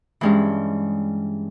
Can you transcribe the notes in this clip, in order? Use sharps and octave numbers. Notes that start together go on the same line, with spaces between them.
G2 E3 G#3 C#4